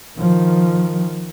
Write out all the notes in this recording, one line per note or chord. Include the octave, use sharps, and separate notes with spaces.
D#3 F3